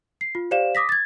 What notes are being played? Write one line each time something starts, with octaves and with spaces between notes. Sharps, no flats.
C7
F4
G4 C5 D5 F5 E7
D6 D#6 A#6 B6
G#6 A6